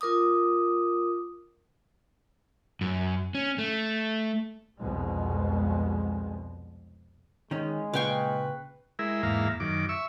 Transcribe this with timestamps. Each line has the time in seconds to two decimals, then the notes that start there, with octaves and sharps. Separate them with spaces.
0.01 F4 A#4 D6 D#6
2.81 F#2
3.35 C#4
3.58 A3
4.79 C2 F2 B2 G#3
7.51 D#3 G#3 C#4
7.94 A#2 C#3 B4 F5 G5 C#6
8.99 G#3 E4 A#4 E5
9.23 E2 G#2 A#3 E5 F5 A#5
9.60 F#2 D#3 D6
9.89 E5 C#6 E6